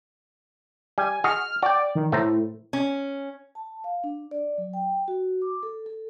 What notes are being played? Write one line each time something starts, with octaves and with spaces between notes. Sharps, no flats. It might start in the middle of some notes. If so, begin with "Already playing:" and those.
G3 G#5
F#4 G#4 D#5 F6
F#4 D5 G5
D#3
A2 A3 C5 A#5
C#4
A5
F5
D4
D5
F#3
G5
F#4
D6
A4
A4